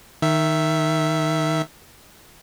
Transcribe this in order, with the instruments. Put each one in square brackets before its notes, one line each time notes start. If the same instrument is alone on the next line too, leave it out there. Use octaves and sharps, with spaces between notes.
[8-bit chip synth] D#3 E5